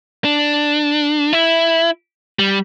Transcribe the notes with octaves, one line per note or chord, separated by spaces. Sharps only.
D4
E4
G3